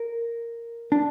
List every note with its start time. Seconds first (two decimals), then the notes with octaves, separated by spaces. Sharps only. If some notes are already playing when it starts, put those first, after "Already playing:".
Already playing: A#4
0.92 D4